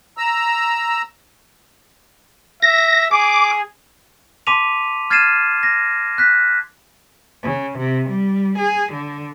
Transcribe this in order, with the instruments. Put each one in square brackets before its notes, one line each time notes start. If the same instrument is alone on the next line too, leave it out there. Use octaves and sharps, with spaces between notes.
[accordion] A#5 E6
[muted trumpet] E5 [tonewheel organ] A#6
[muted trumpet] G#4 [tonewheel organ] D6
[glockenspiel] A5 C6 D6 B6 D#7 F7
F6 G#6 A6 C7 D#7 E7
A#6
F#6 B6
[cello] C#3
C3
G3
G#4
D3